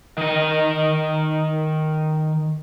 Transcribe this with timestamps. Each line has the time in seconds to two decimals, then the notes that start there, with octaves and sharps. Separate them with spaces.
0.18 D#3 D#5